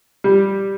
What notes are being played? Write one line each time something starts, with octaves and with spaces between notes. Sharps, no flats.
G3